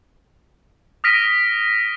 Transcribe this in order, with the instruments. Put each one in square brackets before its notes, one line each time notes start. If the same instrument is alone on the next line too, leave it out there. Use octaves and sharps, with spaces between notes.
[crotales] D#6 F6 A#6 B6 D7 D#7